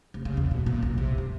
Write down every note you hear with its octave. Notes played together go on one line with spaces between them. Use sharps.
F1
C#3
E2
B2
A#2
B1
C3
F2